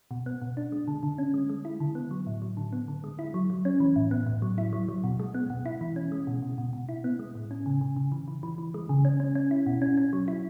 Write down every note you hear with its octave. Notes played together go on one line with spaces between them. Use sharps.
B2
B3
B2
D4
G#3
D3
D3
C#4
G#3
G#3
E4
D3
B3
F#3
A2
F#3
D3
B3
D3
G#3
E4
F#3
F#3
C#4
E3
A2
B3
A2
F#3
E4
F#3
F#3
B2
G#3
B3
B2
E4
E3
C#4
G#3
B2
B2
B2
B2
E4
B3
G#3
A2
C#4
C#3
C#3
C#3
E3
E3
E3
E3
G#3
C#3
C#4
C#4
C#4
E4
B2
C#4
C#4
F#3
E4